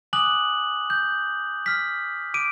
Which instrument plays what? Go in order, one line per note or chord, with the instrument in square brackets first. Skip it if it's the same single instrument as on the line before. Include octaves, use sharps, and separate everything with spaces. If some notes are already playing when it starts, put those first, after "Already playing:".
[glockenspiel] G#5 D6 D#6 F#6 F#7
G6
F6 B6
D6 D7 D#7